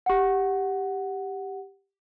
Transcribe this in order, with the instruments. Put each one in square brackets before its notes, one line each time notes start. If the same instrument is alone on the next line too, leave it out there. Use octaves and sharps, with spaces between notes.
[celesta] G4 F#5